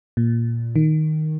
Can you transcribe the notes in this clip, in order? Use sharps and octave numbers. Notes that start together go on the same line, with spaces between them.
A#2
D#3